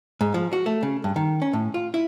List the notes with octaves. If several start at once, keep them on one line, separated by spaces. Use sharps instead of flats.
G#2
F3
F#4
A3
C#3
G2
D#3
C#4
A2
F4
E4